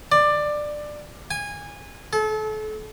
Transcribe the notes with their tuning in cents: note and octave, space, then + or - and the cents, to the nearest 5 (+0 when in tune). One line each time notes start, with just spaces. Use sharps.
D5 +15
G#5 -20
A4 -35